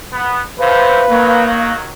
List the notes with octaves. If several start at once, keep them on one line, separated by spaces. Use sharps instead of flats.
B3
A2 C3 B4 C5 F5
D#3 F#3 A#3